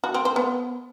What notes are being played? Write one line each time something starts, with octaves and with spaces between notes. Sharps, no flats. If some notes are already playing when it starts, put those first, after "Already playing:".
F#4
C4
C5
B3